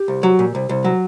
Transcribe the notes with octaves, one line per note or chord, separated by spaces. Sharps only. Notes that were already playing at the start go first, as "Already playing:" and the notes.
Already playing: G4
C2
F#3
A#2
C2
C2
F#3